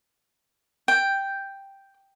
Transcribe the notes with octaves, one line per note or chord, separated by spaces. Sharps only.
G5